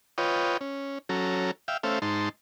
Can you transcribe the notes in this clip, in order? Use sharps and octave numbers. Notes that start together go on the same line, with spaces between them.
F4 B4 C#5 D#5 G5
C#4
F#3 C#4 A4 A#5
E5 F5 G5
A3 C#4 A4 C5 E5 F5
G#2 D#4 A5 C6